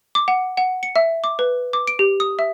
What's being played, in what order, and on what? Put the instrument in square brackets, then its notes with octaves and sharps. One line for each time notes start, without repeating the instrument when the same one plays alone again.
[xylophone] D6
F#5
F#5
C#7
E5
D6
B4
D6
D7
G4
D#6
E5